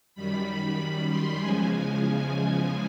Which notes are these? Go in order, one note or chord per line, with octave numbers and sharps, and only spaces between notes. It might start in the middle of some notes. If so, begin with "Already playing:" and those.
F#2 D#3 G3 B5
B5
B5
C6
E2 C#3 F3 G#3 G#5
G#5